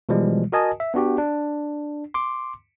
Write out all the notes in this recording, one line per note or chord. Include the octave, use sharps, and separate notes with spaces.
B2 E3 F3 G3 G#3
F#4 A#4 D#5 G#5 A5 D#6
E5
B3 D4 F#4 G4
D4
C6 D6